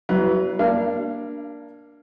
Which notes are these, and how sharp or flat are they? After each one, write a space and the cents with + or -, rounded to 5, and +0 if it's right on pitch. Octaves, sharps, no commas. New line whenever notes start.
F#3 +35 E4 +0 B4 +0
A#3 +15 D4 +0 F5 -30